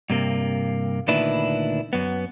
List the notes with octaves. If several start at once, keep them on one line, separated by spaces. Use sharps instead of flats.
G2 C3 A#3
D2 A#2 D#3 D4 E4 B4
F#2 B3